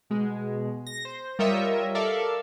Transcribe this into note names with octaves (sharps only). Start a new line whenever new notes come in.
B2 G#3
A#6
C5
G3 F4 A#4 C#5 D#5 E5
A4 A#4 D5 E5 F5